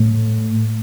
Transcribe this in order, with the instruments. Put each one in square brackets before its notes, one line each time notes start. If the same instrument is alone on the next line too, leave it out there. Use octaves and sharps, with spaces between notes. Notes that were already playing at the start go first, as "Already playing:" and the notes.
Already playing: [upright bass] A2